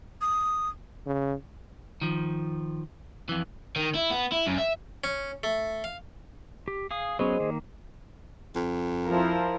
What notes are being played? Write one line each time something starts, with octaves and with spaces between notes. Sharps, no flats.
D#6
C#3
D#3 F3
F2 E3
D#3
E4
B3
E4
F#2
E5
C#4
A3
F5
G4
G#4 F5 D#6
F#3 B3 C#4 G#4 C5 D#5
D#3 A#3
F2
F3 E4 A#4